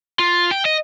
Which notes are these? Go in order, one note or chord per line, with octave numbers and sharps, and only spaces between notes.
F4
G5
D#5